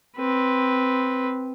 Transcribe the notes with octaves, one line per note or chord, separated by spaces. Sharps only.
C4 B4